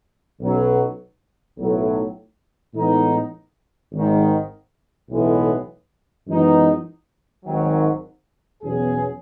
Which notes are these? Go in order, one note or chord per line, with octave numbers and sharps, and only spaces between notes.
B1 B2 F#3 C#4
B1 A2 F#3 A3
A2 E3 G#3 B3 D#4
G#1 G#2 D#3
B1 A2 E3 G#3 B3
F#2 E3 G#3 B3 D#4
G#1 G#2 D#3 F#3
E2 B2 F#3 C#4 G#4